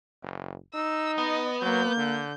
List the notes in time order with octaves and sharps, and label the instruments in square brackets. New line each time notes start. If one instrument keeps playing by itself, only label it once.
[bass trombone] F#1
[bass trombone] D#4 [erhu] E6
[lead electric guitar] B3 [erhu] D#5
[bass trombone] F#3 [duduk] A#3 [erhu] G6
[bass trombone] D3